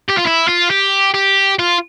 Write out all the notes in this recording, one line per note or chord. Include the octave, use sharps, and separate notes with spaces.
G4
F4
E4
F4
G4
G4
F4